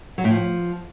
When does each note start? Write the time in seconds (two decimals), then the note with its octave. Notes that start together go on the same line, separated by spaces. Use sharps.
0.18 F#3
0.24 A2
0.30 F3